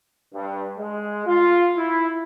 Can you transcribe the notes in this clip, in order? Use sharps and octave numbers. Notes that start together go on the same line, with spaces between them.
G2
G#3
F4
E4